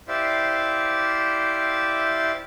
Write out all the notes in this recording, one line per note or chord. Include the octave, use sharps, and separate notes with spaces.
E4 G4 C5 D5 E5 F5